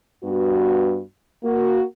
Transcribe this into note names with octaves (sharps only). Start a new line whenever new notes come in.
G2 B3 F#4
A#3 F#4